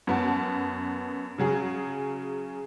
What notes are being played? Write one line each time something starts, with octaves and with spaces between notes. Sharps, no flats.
F#2 B3 A5
C#3 F#3 G#4